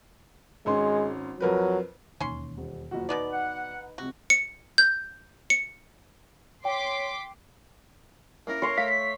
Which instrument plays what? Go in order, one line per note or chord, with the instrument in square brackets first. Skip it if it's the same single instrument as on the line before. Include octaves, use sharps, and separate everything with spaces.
[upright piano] G#1 C#4 C6 [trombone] G#3
[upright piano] F2 A#4 B4 [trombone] F#3
[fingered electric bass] E1 D#2 D#3 [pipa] C#4 C6
[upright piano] D#1
F#1 F3 F#4
[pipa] B2 B3 D5 [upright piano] D#4 B4
[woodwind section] F#5
[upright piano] F2 C3 [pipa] F#4
[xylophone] C#7
G6
C#7
[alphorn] C#5 [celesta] G5 [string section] C6 D6 B6
[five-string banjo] A#3 C#4 E4 [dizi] A#4
[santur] C#5 C6 C#6
[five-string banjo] A3 F5 [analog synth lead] B6